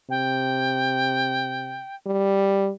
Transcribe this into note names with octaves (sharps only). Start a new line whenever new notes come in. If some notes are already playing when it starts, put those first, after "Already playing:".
C3 G5
G3